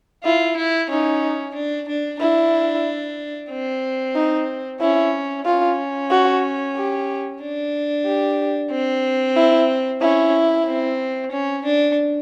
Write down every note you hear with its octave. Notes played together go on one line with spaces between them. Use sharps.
E4 F4
E4
C#4 D#4
D4
D4
D4 E4
C4
D#4
C#4 E4
C#4 F4
F#4
G4
D4
G4
C4
E4
C#4 E4
C4
C#4
D4